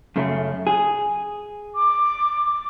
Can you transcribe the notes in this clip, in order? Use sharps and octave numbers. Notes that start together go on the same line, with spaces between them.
F#2 C#3 A3
G#4
D6